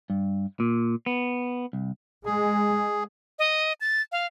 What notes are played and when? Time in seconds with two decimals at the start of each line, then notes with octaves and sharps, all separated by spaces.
0.10 G2
0.60 A#2
1.06 B3
1.73 C2
2.26 G#3 G#4
3.39 D#5
3.81 A6
4.12 F5